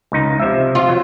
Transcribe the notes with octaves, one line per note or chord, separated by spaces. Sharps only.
C#2 D#4
C3 F3 E5
F4
F#3